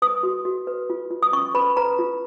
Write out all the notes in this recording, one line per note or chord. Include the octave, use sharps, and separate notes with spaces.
B4 D#6
F#4
F#4
B4
F4
F4
D#6
C#4 C#6
B4 B5
B4 A#5
F4